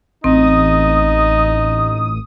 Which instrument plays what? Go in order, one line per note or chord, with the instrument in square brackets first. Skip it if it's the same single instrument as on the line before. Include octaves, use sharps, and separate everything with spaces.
[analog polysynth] A1 D#6 [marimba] C4 [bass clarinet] D#4